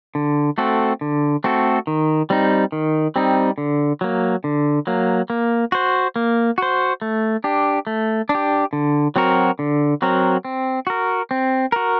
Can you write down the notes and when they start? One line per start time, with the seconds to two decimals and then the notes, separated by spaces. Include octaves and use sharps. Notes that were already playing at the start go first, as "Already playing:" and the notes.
0.15 D3
0.58 A3 C4 F#4 A4
1.01 D3
1.44 A3 C4 F#4 A4
1.87 D#3
2.30 G3 C4 D#4
2.72 D#3
3.16 G3 C4 D#4
3.58 D3
4.01 F#3 A#3
4.44 D3
4.87 F#3 A#3
5.30 A#3
5.72 F#4 C5
6.16 A#3
6.58 F#4 C5
7.02 A3
7.44 D4 G4
7.87 A3
8.29 D4
8.35 G4
8.73 D3
9.16 F#3 C4 F#4 A#4
9.59 D3
10.02 F#3 C4 F#4 A#4
10.45 C4
10.87 F#4 A#4
11.31 C4
11.72 F#4 A#4